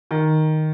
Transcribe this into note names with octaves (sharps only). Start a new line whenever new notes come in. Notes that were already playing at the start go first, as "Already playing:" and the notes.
D#3